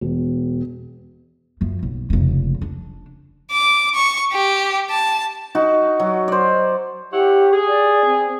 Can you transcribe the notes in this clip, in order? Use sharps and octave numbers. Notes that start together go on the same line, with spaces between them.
E1
F#2 F3
B1
F1 C#3
D4
D6
C#6
G4
A5
D#4 F#4
F#3
C5 D5
E4 G4 C#5 F#5
G#4
D5
C4